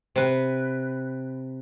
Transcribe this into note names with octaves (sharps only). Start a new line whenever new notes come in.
C3 B4